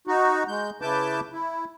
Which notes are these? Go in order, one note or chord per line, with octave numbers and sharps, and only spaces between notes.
D#4 F#4
G#3 G6
C#3 E4 B4 A5 D6 G6
E4